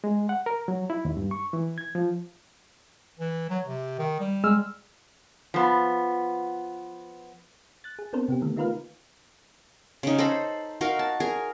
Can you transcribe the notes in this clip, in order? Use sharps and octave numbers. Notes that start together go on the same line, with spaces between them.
G#3
F#5
A#4
F#3
E4
D#2
G2
C#6
E3
G#6
F3
E3
F#3
C3
D#3
G3
G#3 E6 F6
F3 B3
F#6 A6
G#4
B3 C4 D4 A4 A#4 C5
C3 B3 G4
D3 D#3 A3 A#3
A3 D#4 F4 A#4 B4 F5
C#3 D#4
A4 C5 D#5 B5
D#4 F#4 A#4 F5
A5
G#4 A#4